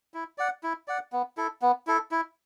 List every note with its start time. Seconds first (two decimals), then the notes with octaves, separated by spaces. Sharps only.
0.14 E4
0.38 D5 F#5
0.63 E4
0.88 D5 F#5
1.12 B3
1.37 E4 A4
1.62 B3
1.87 E4 A4
2.11 E4